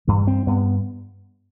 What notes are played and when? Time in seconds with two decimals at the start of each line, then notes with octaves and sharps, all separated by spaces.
0.07 G2 E3
0.27 C4
0.47 G2 B3